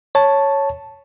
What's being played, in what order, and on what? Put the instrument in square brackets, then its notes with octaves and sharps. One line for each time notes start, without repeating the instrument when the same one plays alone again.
[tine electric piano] C#5 A5